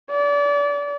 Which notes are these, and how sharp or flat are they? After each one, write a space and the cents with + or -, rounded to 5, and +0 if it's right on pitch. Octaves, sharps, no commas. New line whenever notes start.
D5 -30